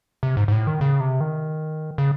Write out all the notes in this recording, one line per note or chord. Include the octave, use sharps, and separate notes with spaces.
C3
G#2
G#2
A2
D#3
C#3
C3
D#3
C#3